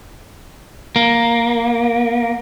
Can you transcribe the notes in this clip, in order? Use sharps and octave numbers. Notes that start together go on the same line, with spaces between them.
A#3